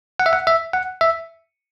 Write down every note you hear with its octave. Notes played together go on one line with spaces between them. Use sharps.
F#5
E5
F#5
E5
F#5
E5